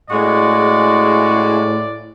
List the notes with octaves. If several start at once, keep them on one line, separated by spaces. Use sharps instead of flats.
A2 C#3 G#3 F#4 G#4 D5